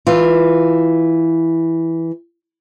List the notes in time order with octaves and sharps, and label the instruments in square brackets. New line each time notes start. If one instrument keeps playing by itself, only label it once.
[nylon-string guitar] E3 F4